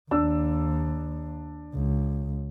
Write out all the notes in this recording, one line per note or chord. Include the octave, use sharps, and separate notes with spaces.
D#2 D4 E6
C#2